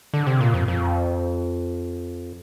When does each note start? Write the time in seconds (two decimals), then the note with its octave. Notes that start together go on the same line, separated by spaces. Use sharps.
0.14 D3
0.27 C3
0.41 A#2
0.54 F2
0.68 F2